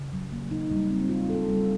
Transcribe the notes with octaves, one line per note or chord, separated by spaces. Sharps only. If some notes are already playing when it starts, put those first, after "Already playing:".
Already playing: C#3
F#3
A#3
D#4
G3
C4
F4
A4
G3